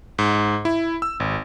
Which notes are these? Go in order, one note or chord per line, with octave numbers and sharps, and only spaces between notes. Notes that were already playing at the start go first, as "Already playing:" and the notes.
G#2
E4
E6
G#1